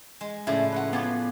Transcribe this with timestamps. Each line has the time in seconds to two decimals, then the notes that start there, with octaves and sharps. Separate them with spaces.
0.21 G#3
0.47 A2 C#3 F3 E4 D5 D6
0.72 B4 C#5 F#5
0.93 B3 F4 D5 G#5 D6